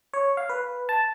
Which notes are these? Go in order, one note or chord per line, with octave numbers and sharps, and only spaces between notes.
C#5
F5
B4
A5